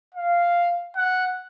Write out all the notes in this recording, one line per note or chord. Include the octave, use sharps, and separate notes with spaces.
F5
F#5